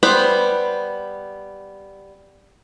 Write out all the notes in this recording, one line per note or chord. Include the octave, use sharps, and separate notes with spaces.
G3 B3 C5